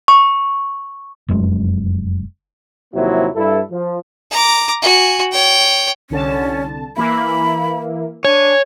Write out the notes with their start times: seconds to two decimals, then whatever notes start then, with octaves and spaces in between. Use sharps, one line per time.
0.08 C#6
1.29 F1 F#2 B2 G#3
2.94 D#2 C3 F3 F#3 A#3 E4
3.36 G2 E4 A4
3.71 F3
4.31 A#5 D6
4.82 F#4 G#5
5.32 C#5 G5
6.10 C2 D3 C#4 A5
6.96 E3 A#3 E4 B5
8.25 D4 C#5 G#5